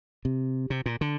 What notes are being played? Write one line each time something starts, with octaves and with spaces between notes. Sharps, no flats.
C3
C3
A#2
D3